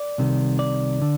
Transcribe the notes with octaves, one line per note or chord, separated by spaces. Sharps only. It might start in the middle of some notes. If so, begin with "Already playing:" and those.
Already playing: D5
C2 C3 D#3
D5
D3